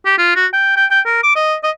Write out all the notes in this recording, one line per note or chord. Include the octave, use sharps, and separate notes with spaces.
G4
F4
F#4
G5
G5
G5
A#4
D6
D#5
D#5